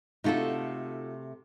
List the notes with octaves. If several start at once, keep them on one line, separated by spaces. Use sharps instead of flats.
C3 A3 D#4 F4 F#4 A4